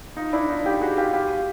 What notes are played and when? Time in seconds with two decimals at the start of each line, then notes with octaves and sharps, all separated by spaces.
0.17 D#4 F4
0.33 D4 E4
0.49 D#4 F4
0.65 F4 G4
0.81 F#4 G#4
0.97 F4 G4
1.13 F4 G4